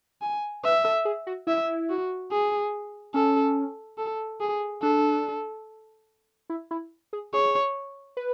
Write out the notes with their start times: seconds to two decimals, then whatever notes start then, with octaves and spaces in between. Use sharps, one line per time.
0.22 G#5
0.64 B4 E5
0.84 A4
1.05 G#4
1.27 F#4
1.47 E4 E5
1.89 F#4
2.32 G#4
3.14 C#4 A4
3.98 A4
4.40 G#4
4.82 D4 A4
6.50 E4
6.71 E4
7.13 G#4
7.33 G#4 C#5
8.17 B4